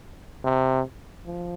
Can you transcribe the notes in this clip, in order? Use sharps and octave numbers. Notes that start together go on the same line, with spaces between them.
C3
F3